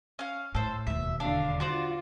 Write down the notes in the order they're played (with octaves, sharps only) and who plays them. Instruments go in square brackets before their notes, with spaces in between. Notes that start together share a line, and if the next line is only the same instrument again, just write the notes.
[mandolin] C#4 F5
[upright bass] A2 [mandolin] A4 C5
[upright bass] E1 D#2 [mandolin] E5
[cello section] D3 F5 [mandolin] D4
[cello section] F4 [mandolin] F#4 C5 D5